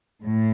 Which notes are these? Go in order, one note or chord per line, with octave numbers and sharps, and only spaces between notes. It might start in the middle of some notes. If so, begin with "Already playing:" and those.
A2